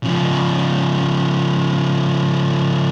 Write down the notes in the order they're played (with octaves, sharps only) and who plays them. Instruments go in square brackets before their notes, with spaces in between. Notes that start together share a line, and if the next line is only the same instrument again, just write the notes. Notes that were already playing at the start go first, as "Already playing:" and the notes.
[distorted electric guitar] C#3 F3